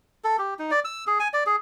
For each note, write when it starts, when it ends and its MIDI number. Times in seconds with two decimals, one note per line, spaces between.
0.24 0.37 69
0.39 0.54 67
0.59 0.71 63
0.71 0.80 74
0.85 1.05 88
1.07 1.19 68
1.20 1.28 80
1.33 1.44 74
1.46 1.56 68